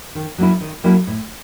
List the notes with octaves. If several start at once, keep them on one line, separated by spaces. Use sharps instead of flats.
D#3
F#3 A#3 C#4 E4
D#3
F#3 A#3 C#4 E4
A2